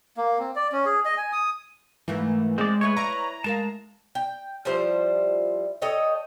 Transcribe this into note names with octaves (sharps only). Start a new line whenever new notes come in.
A#3
C4
D5
C#4
G#4
D#5
G#5
D#6
G#2 E3 A3 A#3
G#3 C4 D5
A3 E4 G#4 B4 C#5
E4 D5 A#5
G#3 A#4 F5 A5
G5
F3 G3 E4 C5
A4 C#5 D#5 G5